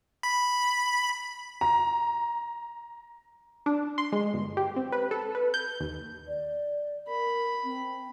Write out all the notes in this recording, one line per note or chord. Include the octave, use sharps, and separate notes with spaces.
B5
A#5
D4
C6
G#3
G1
G4
C4
B4
A4
B4
G6
D#2
D5
A#4 B5
C4